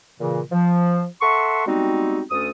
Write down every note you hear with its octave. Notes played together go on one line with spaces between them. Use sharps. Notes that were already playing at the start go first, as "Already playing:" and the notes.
A#2 C#3 E3
F3
A4 E5 F#5 C6 C#6
G3 G#3 B3 C4 D#4 F#4
D2 A3 C#4 A4 D#6